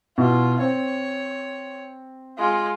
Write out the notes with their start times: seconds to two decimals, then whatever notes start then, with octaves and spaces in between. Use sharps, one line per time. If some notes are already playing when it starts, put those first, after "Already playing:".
0.18 B2 E4 F4
0.60 C4 C#5
2.38 G#3 F4